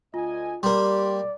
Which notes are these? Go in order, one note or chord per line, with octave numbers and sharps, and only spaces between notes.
D2 F4 D#5 G#5
G3 A#3 G4 D5 C6